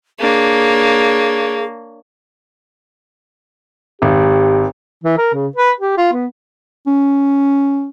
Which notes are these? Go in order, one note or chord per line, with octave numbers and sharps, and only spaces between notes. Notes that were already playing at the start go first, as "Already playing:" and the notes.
A#3 D4 G#4 C#5
G#1 G4
E3
A#4
C#3
B4
G4
F4
B3
C#4